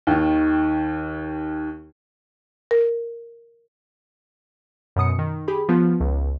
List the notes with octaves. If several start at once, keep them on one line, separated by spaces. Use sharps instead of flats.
D#2 D#3
A#4
F#2 B2 D#6 C#7
D#3
G4 G#4 B5
F3 B3 F4
C#2